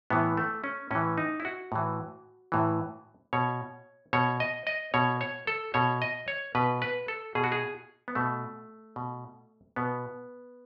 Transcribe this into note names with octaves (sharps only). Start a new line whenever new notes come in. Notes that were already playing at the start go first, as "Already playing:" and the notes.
A2 E3 B3
A3
C#4
A2 E3 C#4
D#4
E4
F#4
A2 E3
A2 E3
B2 C#5
B2 C#5
D#5
D#5
B2 C#5
C#5
A4
B2 C#5
D#5
C#5
B2 B4
B4
A4
B2 G#4
F#4
G#4
B3
B2 A3
B2
B2 B3